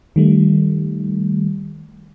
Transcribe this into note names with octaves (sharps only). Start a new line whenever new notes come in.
D#3 G3 A3